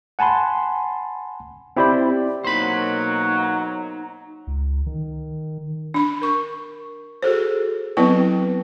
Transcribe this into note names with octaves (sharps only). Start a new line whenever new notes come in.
F#5 G#5 A5 B5 C6
C4 E4 G4 C5 D5 B5
B2 F#3 A#3 D#4 C5 B5
C#2
D#3
D4 B5
A#4 C#6
F#4 G#4 A4 C5
F#3 B3 C4 E4 B4 G5